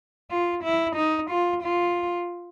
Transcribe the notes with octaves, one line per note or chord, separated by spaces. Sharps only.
F4
E4
D#4
F4
F4